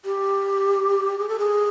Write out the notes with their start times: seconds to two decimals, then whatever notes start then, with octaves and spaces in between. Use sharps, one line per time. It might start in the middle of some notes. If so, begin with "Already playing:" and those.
0.05 G4
1.19 G#4
1.29 A4
1.39 G#4